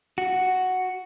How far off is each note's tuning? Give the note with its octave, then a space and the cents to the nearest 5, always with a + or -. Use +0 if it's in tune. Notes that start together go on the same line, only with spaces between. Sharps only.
F#4 +0